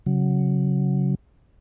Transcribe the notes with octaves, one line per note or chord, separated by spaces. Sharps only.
C#3 F#3